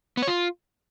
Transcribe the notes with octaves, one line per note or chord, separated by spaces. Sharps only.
B3
C#5
F4